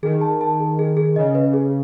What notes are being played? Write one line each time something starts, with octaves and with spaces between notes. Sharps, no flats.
D#3 G#4
A5
A5
G#4
G#4
G#4
C#3 D#5
B4
G#4